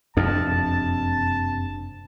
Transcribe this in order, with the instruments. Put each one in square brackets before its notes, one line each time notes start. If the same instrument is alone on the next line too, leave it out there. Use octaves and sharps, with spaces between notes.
[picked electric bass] F#1 C3 D4 [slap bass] F2 [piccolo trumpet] A5